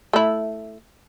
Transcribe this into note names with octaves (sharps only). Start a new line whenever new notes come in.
A3 E4